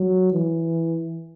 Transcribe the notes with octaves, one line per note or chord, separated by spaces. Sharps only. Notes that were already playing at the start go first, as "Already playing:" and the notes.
Already playing: F#3
E3